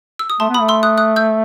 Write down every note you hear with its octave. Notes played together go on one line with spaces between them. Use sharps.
E6
D#6
A3 A5 C6
B3 B5 D#6
A3
C6 E6
D#6 F#6
D#6 F#6
E6 G6